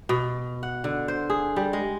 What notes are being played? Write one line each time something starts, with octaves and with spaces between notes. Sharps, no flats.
B2
F#5
D3
C5
G#4
G3
G#3